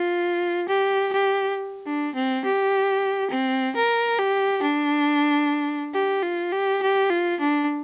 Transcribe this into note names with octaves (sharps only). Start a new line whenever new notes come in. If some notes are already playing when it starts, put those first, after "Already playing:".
Already playing: F4
G4
G4
D4
C4
G4
C4
A#4
G4
D4
G4
F4
G4
G4
F4
D4